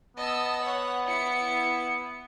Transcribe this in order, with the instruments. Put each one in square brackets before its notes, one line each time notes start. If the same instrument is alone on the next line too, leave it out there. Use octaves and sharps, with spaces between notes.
[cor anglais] B3 [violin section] D#5 A5 E6
[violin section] C#5 F#5
E4 C#7